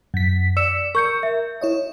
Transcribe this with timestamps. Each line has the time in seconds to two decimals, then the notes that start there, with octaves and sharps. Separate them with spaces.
0.14 F#2 B6
0.57 D5 E6 C#7 E7
0.95 A#4 C#6 G6 C#7
1.23 E5
1.61 E4 C#5 D#5